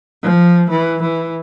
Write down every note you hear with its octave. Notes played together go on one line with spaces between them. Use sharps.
F3
E3
E3